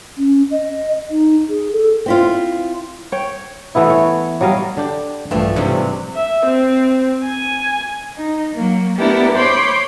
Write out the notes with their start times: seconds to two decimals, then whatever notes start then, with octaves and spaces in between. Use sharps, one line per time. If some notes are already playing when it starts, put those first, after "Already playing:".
0.18 C#4
0.51 D#5
1.11 D#4
1.49 G#4
1.73 A4
2.06 C4 E4 F4
3.12 C#5 G5
3.75 E3 A3 B3 E4
3.90 C#5
4.41 F#3 G3 D#5 F5
4.77 D3 D4 G4
5.31 A#1 G2 E3 F3 A3
5.56 G#2 C3 F#3 G3 C4 D4 G4
6.15 E5
6.46 C4
7.25 G#5
8.17 D#4
8.55 F#3 A#3
8.98 A3 B3 D4 E4 G4 A#4
9.37 C5 C#5 B5 C6 D6